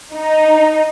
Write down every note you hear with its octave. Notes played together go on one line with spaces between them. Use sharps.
D#4